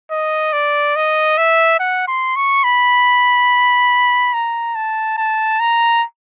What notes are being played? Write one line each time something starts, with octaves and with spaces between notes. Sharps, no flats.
D#5
D5
D#5
E5
F#5
C6
C#6
B5
A#5
A5
A5
A#5